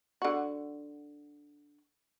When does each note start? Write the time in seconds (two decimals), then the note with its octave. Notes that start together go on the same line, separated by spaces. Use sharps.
0.22 D3 F#4